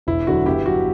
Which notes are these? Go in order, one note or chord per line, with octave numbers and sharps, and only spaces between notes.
E1 E4
D2 D3 F#3 F#4
G1 E4 G4
F#3 F#4